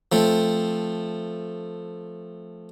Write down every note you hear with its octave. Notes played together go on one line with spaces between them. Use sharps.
F3 A3 C4